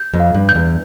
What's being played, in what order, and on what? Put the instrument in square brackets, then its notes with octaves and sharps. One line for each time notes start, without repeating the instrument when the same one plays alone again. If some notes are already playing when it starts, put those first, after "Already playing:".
Already playing: [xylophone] G6
[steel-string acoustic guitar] F2
[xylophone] F5
[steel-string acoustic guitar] G2
[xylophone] G6
[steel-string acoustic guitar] E2